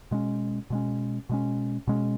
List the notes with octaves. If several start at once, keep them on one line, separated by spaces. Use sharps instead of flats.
B2 G#3 C#4
B2 G#3 C#4
B2 G#3 C#4
B2 G#3 C#4